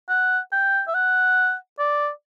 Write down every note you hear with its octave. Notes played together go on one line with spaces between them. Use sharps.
F#5
G5
E5
F#5
D5